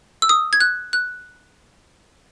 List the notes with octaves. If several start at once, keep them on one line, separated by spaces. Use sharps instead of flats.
E6
D#6
G#6
F#6
F#6